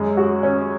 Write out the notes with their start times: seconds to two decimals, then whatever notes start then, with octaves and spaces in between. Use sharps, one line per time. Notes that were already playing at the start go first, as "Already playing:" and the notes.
Already playing: F#2 G#3
0.17 F#4
0.43 C#4